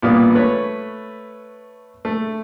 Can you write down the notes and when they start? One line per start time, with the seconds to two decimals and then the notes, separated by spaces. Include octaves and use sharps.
0.02 A#1 A#2 E3 G3 B3 D#6
0.35 A3 B4 C#5
2.05 A3